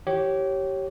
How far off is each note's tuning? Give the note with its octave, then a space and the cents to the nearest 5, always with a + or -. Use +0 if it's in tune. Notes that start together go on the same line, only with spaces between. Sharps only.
E3 +0 G4 -20 C#5 -10